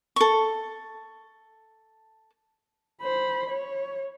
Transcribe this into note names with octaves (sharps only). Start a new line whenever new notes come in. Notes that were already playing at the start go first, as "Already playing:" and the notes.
A4 C#6
C5 B5
C#5